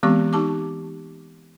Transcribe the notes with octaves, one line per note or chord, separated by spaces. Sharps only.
E3 G#3 B3 C4 G4 C#6
D#4 G4 A5 D6